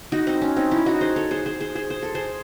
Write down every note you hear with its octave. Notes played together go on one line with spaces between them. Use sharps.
D#4 F#4
C4 D#4
C#4
C4 D#4
C#4 E4
D#4 F#4
G#4 C5
A4 C#5
G#4 C5
G#4 C5
G#4 C5
G#4 C5
C5
A4
G#4 C5